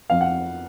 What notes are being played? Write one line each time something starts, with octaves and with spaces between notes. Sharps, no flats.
F2 F5
F#5